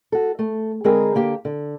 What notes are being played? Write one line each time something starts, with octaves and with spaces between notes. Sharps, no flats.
F#4 A4
A3
D3 G#3 C4 G#4 A#4 B4
D3 A#3 G4
D3